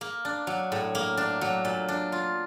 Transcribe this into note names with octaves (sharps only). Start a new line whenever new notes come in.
A#3
D4
F#3
A2
A#3
D4
F#3
A#2
D4
F4